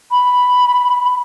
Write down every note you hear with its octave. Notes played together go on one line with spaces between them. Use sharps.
B5